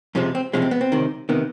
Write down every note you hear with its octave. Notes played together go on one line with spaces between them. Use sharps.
F2 C3 F3 G#3 C#4
C4
F2 C3 F3 G#3 C#4
C4
B3
C4
C#2 C3 D#3
C3 D#3 B3